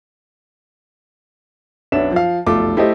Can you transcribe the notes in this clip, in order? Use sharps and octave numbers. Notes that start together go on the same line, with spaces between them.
B1 B3 C#4 D4 E5 E7
F3 F5
F1 B1 A3 F4 D6
A3 E4 G4 C5 D#5